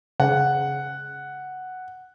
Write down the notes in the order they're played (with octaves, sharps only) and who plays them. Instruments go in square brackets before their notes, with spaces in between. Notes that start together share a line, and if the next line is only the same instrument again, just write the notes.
[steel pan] C#3 [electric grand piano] F#5